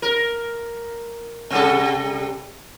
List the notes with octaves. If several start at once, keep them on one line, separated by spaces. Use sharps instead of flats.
A#4
C3 G3 A4